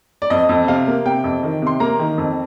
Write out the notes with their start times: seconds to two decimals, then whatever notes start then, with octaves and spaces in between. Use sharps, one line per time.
0.22 D5
0.30 F2 D#5
0.49 F2
0.68 C3 F5
0.87 A#3
1.05 C3 G5
1.24 F2
1.43 D#3
1.62 C3 C6
1.80 A#3 A#5
1.99 D#3
2.18 F2